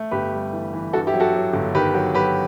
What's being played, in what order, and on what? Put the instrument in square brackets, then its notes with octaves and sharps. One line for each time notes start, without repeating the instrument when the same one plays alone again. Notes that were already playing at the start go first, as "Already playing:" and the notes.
Already playing: [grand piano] A3
G1 G4 B4
G3
E3
E3
G2 F#4 A4
E4 G4
F#3
F#4 A4
F#3
G1
D#3 G4 B4
F#3
F#3 G4 B4